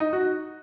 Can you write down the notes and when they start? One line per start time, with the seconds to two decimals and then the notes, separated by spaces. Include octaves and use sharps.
0.00 D#4
0.13 F#4